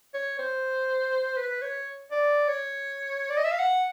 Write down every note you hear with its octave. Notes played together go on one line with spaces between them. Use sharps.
C#5
C5
B4
C#5
D5
C#5
D5
D#5
E5
F5
F#5